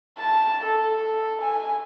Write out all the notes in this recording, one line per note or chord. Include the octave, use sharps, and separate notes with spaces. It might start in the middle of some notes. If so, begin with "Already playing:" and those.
A5
A4
G#5